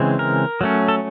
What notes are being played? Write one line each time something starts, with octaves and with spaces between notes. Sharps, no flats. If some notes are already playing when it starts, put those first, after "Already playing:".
Already playing: C#3 E3 G#3 C4
A#4
F#3 A3 C#4
A4